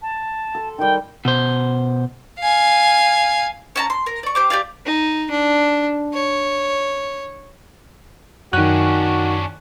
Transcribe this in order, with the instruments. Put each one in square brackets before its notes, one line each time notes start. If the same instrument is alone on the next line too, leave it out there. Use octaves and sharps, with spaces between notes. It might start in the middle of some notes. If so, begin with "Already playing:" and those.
[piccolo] A5
[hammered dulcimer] A4 C6
[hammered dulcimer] D#3 G3 [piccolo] G5
[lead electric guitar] B2 C5
[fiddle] F5 G#5
[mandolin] C#4 A5 A#5
C6
A#4
D5 C#6
G4 C5 D6
G4 G#4 D5 F5
[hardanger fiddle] D#4
D4
C#5
[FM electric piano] F#2 [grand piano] D#3 F#6 [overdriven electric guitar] C#4 D4 [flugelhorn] F#4